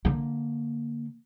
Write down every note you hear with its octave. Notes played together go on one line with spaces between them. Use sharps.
D3 A#3